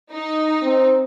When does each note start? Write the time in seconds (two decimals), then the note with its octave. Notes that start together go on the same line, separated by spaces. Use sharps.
0.12 D#4
0.63 C4